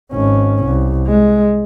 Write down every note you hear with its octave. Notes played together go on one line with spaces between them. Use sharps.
G#1 C#4
C2
G#3